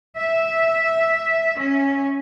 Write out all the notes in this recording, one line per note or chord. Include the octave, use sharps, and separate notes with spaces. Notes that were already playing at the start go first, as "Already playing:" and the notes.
E5
C#4